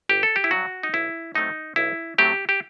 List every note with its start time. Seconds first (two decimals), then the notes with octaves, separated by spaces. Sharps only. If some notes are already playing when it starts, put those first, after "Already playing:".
0.09 G1 G4
0.23 A4
0.36 G4
0.44 E4
0.51 G2 F#3 F#4
0.83 D#4
0.93 B1 E4
1.34 A2 F#3 A3 C4 D#4
1.76 B1 E4
2.18 A2 F#3 A3 C4 G4
2.49 G4